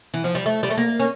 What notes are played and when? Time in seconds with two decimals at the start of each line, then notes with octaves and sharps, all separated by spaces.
0.14 E3
0.24 F3
0.35 G3
0.46 A3
0.63 G3
0.70 A3
0.78 A#3
1.00 C#4